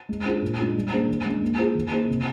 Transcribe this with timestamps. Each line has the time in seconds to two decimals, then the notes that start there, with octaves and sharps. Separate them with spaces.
0.09 G#3
0.25 D4 F4 G#4 C5
0.42 A#2
0.59 G#3 D4 F4
0.75 G3
0.92 A#3 D4 G#4 C5
1.08 D#3
1.25 G#3 D4
1.42 A#3
1.58 F4 G#4 C5
1.75 D#3
1.91 A#3 D#4 G#4 C5
2.08 C3